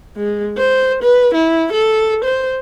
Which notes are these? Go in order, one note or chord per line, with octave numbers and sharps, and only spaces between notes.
G#3
C5
B4
E4
A4
C5